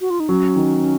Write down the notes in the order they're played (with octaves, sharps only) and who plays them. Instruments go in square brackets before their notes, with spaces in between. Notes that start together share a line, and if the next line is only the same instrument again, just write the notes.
[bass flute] F#4
F4
D#4
[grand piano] F#3 [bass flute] C#4
[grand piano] D#3